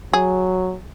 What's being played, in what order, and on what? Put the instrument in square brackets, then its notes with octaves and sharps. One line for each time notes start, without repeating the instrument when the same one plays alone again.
[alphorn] F#3 [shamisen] G#4